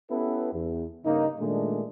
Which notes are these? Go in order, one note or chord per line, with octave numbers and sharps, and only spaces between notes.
B3 C#4 E4 G4 A4 B4
E2
G2 C#3 A#3 D#4
A#2 D#3 G#3 A3 D4